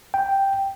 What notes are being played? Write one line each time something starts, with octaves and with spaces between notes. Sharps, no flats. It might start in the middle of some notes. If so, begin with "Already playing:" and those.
G5